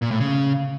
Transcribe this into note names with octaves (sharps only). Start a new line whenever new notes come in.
A#2
A2
C#3